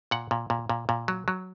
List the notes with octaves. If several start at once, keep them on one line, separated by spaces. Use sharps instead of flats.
A#2 F#5
A#2
A#2
A#2
A#2
F#3
F#3